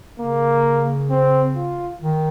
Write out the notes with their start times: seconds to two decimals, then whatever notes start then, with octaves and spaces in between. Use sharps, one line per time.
0.20 C#3 A#3
1.11 C4
1.56 F4
2.02 D#3